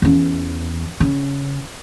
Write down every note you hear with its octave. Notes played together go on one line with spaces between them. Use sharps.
E2 C#4
C#3